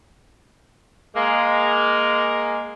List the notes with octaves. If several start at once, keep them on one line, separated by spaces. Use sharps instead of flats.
G#3 A#3